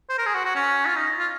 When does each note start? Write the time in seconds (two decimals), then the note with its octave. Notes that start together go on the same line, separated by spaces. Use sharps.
0.09 C5
0.18 A#4
0.26 G#4
0.34 F#4
0.45 F#4
0.55 C#4
0.86 F4
0.96 D#4
1.18 F4